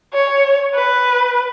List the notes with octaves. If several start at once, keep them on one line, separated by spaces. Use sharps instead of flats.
C#5
B4